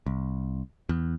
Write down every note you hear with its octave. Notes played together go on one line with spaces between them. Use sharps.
C2
E2